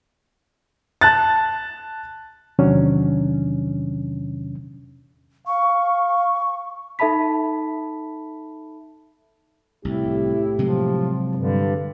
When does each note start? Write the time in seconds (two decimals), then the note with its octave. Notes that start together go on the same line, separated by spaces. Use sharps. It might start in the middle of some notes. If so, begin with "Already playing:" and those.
1.01 A5 F#6 A6
2.59 E2 C3 D#3 F#3 C#4 D4
5.47 F5 C#6
6.99 D#4 A4 E5 A5 B5 B6
9.85 C2 A2 E4 G4
10.59 C3 F3 F#3 G#3
11.35 G2 D3